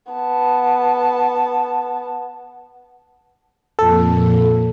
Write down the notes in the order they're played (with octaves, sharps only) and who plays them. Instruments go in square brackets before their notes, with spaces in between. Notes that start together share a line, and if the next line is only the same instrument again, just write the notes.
[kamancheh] B3 A5
[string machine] F2 A#2 [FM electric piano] A4